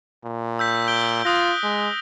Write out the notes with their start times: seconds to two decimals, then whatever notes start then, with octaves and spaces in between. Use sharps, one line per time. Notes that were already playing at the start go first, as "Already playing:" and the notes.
0.24 A#2
0.59 E6 G6 B6
0.88 G6 D7 G7
1.25 F4 D#6 F#6 A#6
1.63 G#3